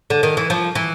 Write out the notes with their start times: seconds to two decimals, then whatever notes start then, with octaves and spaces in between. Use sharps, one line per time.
0.10 D3
0.23 D#3
0.37 E3
0.50 F3
0.75 E3